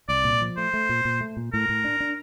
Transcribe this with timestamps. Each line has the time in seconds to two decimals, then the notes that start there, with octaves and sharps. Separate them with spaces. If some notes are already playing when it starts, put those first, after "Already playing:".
0.08 C2 D5
0.24 A#2
0.41 F3
0.57 A3 C5
0.74 A3
0.89 A#2
1.05 A#2
1.21 A3
1.37 A#2
1.53 A2 A#4
1.69 A2
1.84 D4
2.00 D4